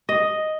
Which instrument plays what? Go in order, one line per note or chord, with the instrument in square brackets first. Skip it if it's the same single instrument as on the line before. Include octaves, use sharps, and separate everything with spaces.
[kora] D#5